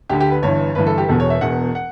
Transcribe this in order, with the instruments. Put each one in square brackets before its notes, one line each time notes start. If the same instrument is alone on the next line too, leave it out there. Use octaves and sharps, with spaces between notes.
[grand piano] D2 D3 G4
G4
B4
G1 G2 E3 C#5
G1 G2 E3 B4
A4
G4
E1 E2 B2 A4
C#5
E5
E1 E2 B2 F#5
F#5